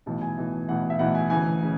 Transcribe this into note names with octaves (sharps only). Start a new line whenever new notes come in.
B1 A2 E3 A5
G#5
B1 A2 E3
B1 A2 E3 F#5
E5
B1 A2 E3 F#5
G#5
D2 C#3 E3 G#5
C#3